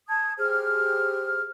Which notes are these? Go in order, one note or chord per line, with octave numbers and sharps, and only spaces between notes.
A5 D#6 G#6
G4 G#4 C5 F6